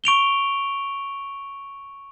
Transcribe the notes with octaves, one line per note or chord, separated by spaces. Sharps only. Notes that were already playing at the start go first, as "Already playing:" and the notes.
C#6 D7 F7 G7